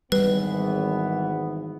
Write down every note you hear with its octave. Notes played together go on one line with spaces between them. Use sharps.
G#1 E3 G3 B3 B4